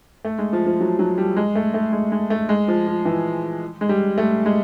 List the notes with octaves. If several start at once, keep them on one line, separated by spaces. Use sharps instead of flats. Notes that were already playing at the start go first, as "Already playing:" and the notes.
A3
G#3
F3
F3
F#3
F#3
G3
G#3
A3
A3
G#3
G#3
A3
G#3
F3
F3
E3
G#3
G3
A3
G#3